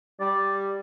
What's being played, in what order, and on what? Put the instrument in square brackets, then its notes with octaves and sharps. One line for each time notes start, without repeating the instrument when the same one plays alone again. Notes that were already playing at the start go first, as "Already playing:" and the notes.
[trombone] G3 [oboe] D5